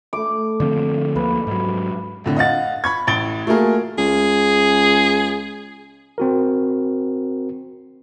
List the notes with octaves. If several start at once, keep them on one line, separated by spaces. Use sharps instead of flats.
A3 D6
D3 F3 C4
D2 F3 A#3 B4
G#2 F#3
F2 A2 D3
D#5 F5 F#5 A6
B5 C#6 G#6
A1 A2 A6 D7 G7
A3 A#3 F4 F#4 G#4 A#4
C#2 G#4
C4 F#4 A#4